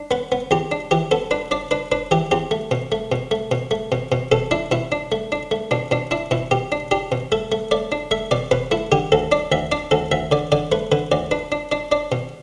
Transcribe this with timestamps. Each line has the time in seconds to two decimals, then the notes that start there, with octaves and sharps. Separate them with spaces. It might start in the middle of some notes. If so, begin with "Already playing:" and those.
Already playing: D4
0.11 B3 B4
0.32 B3
0.51 E2 G4
0.72 D4
0.91 E3 G4
1.11 B3 A4
1.31 D4 B4
1.51 D4 D5
1.71 D4 B4
1.92 D4 B4
2.11 E3 G4
2.31 E2 G4
2.51 A3
2.71 B2
2.92 A3
3.12 B2
3.31 A3
3.51 B2
3.71 A3
3.92 B2
4.12 B2
4.32 B2 A4
4.51 D4 E4
4.71 B2 E4
4.92 D4
5.12 A3
5.32 D4
5.51 A3
5.71 B2 D4
5.91 B2 D4
6.11 D4 E4
6.31 B2 E4
6.51 B2 G4
6.72 D4
6.91 D4 G4
7.12 B2
7.32 A3 A4
7.52 A3
7.71 A3 D5
7.92 D4
8.11 A3 E5
8.31 B2 D5
8.51 B2 B4
8.71 A3 E4
8.92 D3 G4
9.12 D2 A4
9.32 D4 D5
9.52 D2 E5
9.72 D4 D5
9.91 D2 A4
10.12 D2 E5
10.31 D3 D5
10.52 D3 D5
10.72 A3 B4
10.92 D3 B4
11.12 D2 D5
11.31 D4 B4
11.52 D4
11.72 D4 D5
11.92 D4 D5
12.12 B2